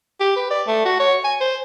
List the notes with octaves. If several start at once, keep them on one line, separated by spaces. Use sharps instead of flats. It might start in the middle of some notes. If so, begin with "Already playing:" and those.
G4
B4
D5
A3
F#4
C#5
G#5
C5